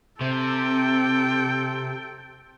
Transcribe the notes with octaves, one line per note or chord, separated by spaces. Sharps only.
C3 A4 G5